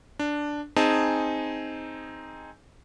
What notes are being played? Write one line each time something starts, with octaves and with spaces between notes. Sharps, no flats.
D4
C4 D#4 G#4 G#5 A5